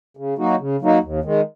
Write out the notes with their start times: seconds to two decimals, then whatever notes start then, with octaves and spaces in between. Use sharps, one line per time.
0.17 C#3
0.38 F#3 A#3 D#4 F#4
0.59 C#3
0.81 F#3 A#3 D#4 F#4
1.03 D#2
1.24 D#3 G#3